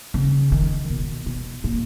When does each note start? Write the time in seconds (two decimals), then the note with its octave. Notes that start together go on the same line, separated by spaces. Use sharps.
0.14 C#3
0.52 D#3
0.90 B2
1.26 B2
1.64 A#2